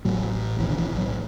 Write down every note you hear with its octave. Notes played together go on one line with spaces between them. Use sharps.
A1 A2 F#3
B1 A2 E3
D3
E3
F#3